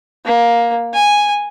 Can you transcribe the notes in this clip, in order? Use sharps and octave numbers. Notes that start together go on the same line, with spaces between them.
A#3
G#5